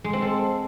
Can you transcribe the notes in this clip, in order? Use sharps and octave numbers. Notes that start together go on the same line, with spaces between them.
G#3
C4
A4